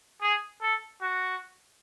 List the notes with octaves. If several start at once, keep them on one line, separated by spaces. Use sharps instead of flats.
G#4
A4
F#4